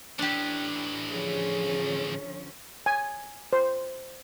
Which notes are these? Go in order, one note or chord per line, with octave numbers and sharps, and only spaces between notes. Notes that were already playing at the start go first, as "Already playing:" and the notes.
A2 E3 D4 G4
D3 F3 C#4 G#4
G#5
C5